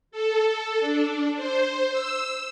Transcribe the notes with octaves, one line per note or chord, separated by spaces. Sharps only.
A4
D4
C5
E6